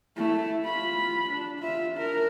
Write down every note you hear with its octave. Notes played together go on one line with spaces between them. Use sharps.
A3 E4
F4 B5
D4
F4 E5
D4 A#4